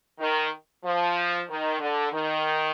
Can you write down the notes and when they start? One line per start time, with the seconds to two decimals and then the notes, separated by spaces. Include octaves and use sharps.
0.19 D#3
0.83 F3
1.48 D#3
1.79 D3
2.11 D#3